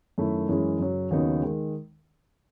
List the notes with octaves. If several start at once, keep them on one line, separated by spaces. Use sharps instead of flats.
F#2 D#3 A3 E4
F#2 E3 G#3 C#4 E4
F#2 C#3 F#3
D#2 C#3 F#3 B3 D#4
D#3 G#3